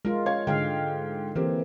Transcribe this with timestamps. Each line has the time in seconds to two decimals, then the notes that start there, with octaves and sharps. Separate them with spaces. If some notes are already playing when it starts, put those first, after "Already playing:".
0.05 G#3 F4 A#4
0.26 C#5 F5 G#6
0.47 G#2 D3 F5 G5
1.36 E3 A#3 C4 G4